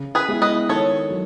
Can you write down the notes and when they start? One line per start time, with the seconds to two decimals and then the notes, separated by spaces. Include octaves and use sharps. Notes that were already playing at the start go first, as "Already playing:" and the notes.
Already playing: C#3
0.15 G#4 B4
0.28 G#3 B3 E4
0.42 B4 D#5
0.69 D#3 A4 C#5
1.10 F#3